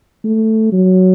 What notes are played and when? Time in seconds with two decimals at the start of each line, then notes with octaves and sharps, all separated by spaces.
0.24 A3
0.72 F#3